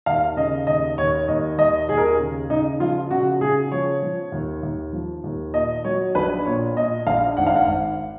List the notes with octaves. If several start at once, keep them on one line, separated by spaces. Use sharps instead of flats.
D#2 F5
C#3 D#5
D#2 D#5
D#2 C#5
D#2 D#5
D#2 D#5
D#2 G#4
A#4
G#4
C#3
C#3 D#4
F3 F4
C#3 F#4
C#3 G#4
F3 C#5
F3
D#2
D#2
F3
D#2
A#2 D#5
F#3 C#5
A#1 B4
A#2 C#5
A#2 D#5
A#1 F5
G#1 F#5
F5
F#5
G#1